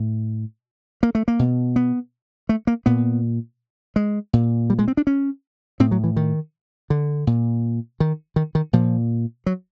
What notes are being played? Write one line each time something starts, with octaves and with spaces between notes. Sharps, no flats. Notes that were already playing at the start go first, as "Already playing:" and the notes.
Already playing: A2
A#3
A3
A#3
B2
B3
A3
A#3
A#2 B3
G#3
A#2
G3
G#3
C4
D4
C#4
A2 C4
F#3
E3
D#3
D3
A#2
D#3
D#3
D#3
A#2 F3
F#3